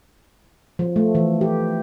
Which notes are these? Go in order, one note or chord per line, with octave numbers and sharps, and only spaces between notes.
F3
A3
E3
G4